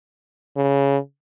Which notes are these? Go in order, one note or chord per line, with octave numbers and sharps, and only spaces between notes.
C#3